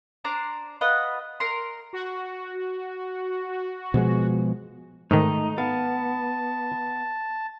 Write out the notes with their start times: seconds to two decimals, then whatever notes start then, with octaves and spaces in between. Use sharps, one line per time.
0.24 D4 C5 A#5 D6
0.81 F4 B4 D#5 F#5
1.40 A#4 C6
1.93 F#4
3.94 B2 F3 G#3
5.11 G#2 D#3 A3 D#4
5.58 B3 F5 A5